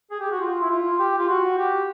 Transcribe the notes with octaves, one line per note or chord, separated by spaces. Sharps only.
G#4
G4
F#4
F4
E4
F4
G4
F4
F#4
G4